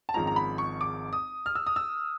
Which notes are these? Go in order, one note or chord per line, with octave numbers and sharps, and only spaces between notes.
A5
G#1 G#2 F3 G#3 C#4 A#5
A#5
B5
C#6
D6
D#6
F6
E6
D#6
E6